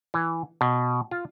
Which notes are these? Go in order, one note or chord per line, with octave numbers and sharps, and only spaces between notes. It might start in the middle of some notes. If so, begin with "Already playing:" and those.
E3
B2
F4